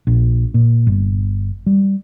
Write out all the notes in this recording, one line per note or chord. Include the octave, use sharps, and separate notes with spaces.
A#1
A#2
G1
G3